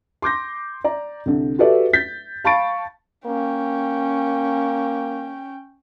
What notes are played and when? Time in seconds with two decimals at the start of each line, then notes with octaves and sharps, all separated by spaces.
0.22 C6 D6 G6 A#6
0.84 D5 A#5
1.26 C2 D3
1.59 F#4 G4 A4 B4 D5 E5
1.93 G6 A6 B6
2.44 F5 A5 B5 C#6 A6 D7
3.26 A#3 C#4 G5